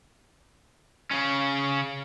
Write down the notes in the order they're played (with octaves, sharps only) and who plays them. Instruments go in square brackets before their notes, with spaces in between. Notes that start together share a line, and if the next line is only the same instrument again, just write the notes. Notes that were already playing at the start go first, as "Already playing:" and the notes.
[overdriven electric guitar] C#3 C#4